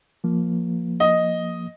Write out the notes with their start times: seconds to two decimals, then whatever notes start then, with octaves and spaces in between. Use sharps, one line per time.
0.24 F3 A#3
1.00 D#5